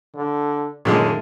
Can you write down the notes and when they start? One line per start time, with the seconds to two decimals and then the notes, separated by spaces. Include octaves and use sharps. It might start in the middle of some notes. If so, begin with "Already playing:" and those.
0.15 D3
0.85 F#2 A#2 D3 D#3 G#3 A3 D#4